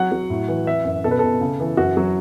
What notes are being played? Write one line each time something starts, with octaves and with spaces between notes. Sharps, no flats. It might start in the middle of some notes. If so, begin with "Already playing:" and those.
Already playing: F#3 F#5
F#3
A2
E3
E3 E5
F#2
B2 A4
B4
B2 A4
C#3
E3
F#2 F#4
F#3